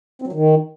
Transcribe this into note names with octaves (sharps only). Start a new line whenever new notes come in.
C4
F#3
D#3